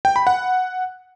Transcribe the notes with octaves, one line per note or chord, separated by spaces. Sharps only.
G5
B5
F#5